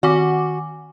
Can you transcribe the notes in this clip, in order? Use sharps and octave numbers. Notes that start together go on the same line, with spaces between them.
D#3 F#4 G#5 D6